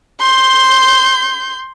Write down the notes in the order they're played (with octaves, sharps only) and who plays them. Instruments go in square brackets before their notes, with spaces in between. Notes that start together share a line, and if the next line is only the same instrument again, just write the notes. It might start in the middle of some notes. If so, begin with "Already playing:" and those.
[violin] C6 G6